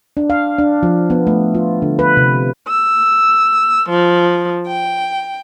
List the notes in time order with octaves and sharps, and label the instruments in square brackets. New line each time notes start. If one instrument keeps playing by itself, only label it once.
[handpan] D4
F5
D4
F3
B3
A3
F4
D3
B4
C3
[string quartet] E6
F3
G5